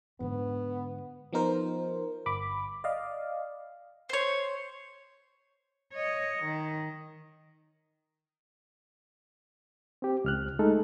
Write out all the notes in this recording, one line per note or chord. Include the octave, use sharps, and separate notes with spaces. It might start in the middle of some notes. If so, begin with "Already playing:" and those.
G#2 D3 B3
F3 B3 D#4 A#4 C5
G1 B5 D6
D5 D#5 F5
C5 C#5
C#5 D#5
D#3
C4 G4
C#2 F6 F#6
G#3 A3 D#4 A4